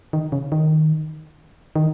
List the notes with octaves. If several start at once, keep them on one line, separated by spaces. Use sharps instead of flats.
D#3
C#3
D#3
D#3